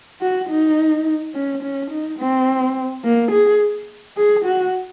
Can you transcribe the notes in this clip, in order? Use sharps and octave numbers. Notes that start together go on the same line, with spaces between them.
F#4
D#4
C#4
C#4
D#4
C4
A#3
G#4
G#4
F#4